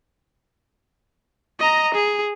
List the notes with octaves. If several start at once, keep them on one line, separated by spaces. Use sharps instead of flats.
D#5 A#5
G#4